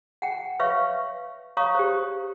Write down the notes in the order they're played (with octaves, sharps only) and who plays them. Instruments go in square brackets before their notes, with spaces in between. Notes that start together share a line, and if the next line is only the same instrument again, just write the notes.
[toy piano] F#5 G5
B4 C#5 E5 F5 C#6
C#5 F5 A#5 C#6 D#6
G4 C5